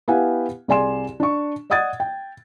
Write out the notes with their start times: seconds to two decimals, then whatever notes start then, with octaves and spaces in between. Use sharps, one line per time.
0.08 B3 E4 G4 F5 F#5 G#5
0.68 C2 G#4 D5 G#5 C6 E7
1.20 D4 C#6
1.70 D5 D#5 F#5 D#6 G#6 A6
2.00 G5